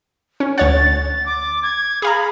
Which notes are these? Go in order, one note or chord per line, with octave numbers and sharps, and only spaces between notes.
C#4
D2 C#5 F#5 A6
D6
G#6
G#4 F5 A#5 B5